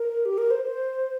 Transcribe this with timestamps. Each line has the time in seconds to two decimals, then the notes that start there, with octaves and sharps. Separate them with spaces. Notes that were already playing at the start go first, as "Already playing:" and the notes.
Already playing: A#4
0.25 G4
0.38 A#4
0.51 C5
0.64 C5